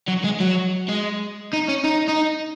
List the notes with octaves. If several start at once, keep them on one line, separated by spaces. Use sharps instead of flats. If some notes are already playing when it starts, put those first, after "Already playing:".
F#3
G#3
F#3
G#3
D#4
C#4
D#4
D#4